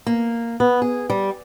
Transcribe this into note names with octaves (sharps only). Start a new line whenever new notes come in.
A#3
B3
G#4
G3